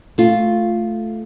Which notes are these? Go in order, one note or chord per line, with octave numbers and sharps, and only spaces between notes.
A3 F4